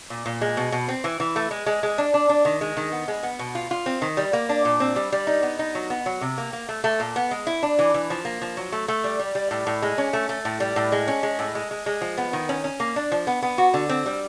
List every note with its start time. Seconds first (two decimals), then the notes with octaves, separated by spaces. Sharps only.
0.10 A#2
0.26 A#2
0.41 G#3
0.57 B2
0.72 B2
0.88 C4
1.04 E3
1.20 E3
1.36 A3
1.51 G#3
1.66 G#3
1.83 G#3
1.98 D4
2.14 D4
2.29 D4
2.45 D#3
2.61 G#3
2.77 D#3
2.92 B3
3.08 G#3
3.23 B3
3.39 B2
3.55 F4
3.71 F4
3.86 C4
4.02 D#3
4.17 G3
4.33 A#3
4.49 D4
4.65 A#2
4.80 C4
4.96 G3
5.12 G3
5.27 D#4
5.43 B3
5.59 D#4
5.75 F#3
5.90 B3
6.06 F#3
6.21 C3
6.38 A#3
6.53 A#3
6.69 A3
6.84 A3
7.00 A#2
7.16 B3
7.31 G#3
7.47 E4
7.63 D4
7.79 E3
7.94 E3
8.10 F3
8.25 A#3
8.42 F3
8.57 F#3
8.72 A3
8.88 A3
9.04 G3
9.19 G3
9.35 G3
9.51 A2
9.67 A2
9.82 G#3
9.98 C#4
10.13 A3
10.29 A3
10.45 A2
10.60 G3
10.76 A2
10.92 G#3
11.08 C#4
11.23 G#3
11.39 A2
11.55 G#3
11.71 G#3
11.86 G#3
12.01 F3
12.17 B3
12.33 D#3
12.49 C#4
12.64 C#4
12.80 A#3
12.96 D4
13.12 F3
13.27 B3
13.43 B3
13.58 F#4
13.74 D3
13.89 C4
14.06 G3